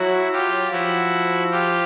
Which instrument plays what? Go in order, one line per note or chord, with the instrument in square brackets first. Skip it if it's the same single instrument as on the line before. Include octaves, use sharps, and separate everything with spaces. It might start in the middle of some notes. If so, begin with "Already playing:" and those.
Already playing: [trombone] F#3 [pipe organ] E4 F#4
[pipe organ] F4 G4
[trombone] F3 [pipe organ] E4 F#4
[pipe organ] F4 G4